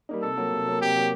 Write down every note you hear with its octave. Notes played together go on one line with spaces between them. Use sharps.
G3 A#3 D#4
C3 A4
F#3 A#3
C3
F#3 A#3
C3 G4
F#3
A#3